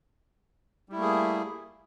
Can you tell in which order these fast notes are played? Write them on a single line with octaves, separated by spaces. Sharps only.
G3 E4 A3 A#3 G#4